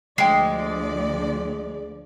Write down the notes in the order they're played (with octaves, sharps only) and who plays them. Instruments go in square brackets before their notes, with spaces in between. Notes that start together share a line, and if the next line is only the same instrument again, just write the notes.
[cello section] D2 F3 D5 [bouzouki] G#3 [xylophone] G5 C7